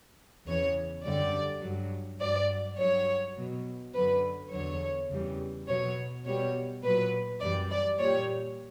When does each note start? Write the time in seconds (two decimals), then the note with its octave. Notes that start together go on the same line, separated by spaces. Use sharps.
0.47 E2 C#3 E3 C#5
1.04 F#2 D3 G3 D5
1.62 G2 F#3
2.20 G2 F#3 D5
2.78 G2 F#3 C#5
3.37 B2 F#3
3.93 F#2 D3 F#3 B4
4.52 E2 D3 F#3 C#5
5.10 E2 C#3 E3 G3
5.68 B2 F#3 C#5
6.25 B2 G3 C#5
6.83 A#2 F#3 B4
7.41 F#2 E3 G3 D5
7.71 D5
7.99 A#2 C#5
8.04 G3